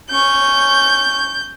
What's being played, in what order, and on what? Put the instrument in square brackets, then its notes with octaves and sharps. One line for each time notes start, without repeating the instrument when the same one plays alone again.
[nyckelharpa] C#4 C#6 [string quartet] G6